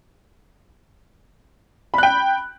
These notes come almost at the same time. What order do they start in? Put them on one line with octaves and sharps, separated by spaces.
B5 F#6 G5